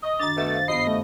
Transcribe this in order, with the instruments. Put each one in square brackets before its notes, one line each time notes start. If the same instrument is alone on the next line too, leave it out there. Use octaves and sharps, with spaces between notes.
[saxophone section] D#5 [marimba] C#6
[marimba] F#2 D#3 D4 [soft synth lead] A6
[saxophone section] B2 A3
[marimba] C5 F5
[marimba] G2 B3 [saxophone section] F3 D#5 [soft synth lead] C7
[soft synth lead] A3